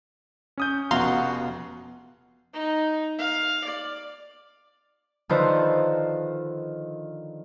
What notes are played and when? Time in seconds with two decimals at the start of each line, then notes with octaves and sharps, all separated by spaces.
0.58 C#4 D#6 G6
0.91 F1 B2 F4 F#4 F5 A#5 C6
2.54 D#4
3.19 F5
3.64 D5
5.29 D3 D#3 F3 D#4 B4 C5